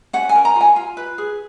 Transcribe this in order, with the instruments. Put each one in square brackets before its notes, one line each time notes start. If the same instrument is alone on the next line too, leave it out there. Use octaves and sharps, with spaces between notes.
[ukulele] C#4 F#5
G#5
A#4
A#5
F4 G#5
F4
B4
G#4